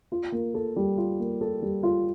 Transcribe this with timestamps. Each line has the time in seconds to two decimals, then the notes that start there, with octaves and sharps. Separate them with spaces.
0.12 F4
0.32 A#3
0.54 A4
0.76 G3
0.98 F4
1.20 A#3
1.41 A4
1.62 G3
1.83 F4